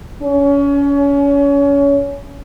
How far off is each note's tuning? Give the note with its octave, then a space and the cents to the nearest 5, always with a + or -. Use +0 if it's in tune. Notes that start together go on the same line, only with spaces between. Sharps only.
C#4 +30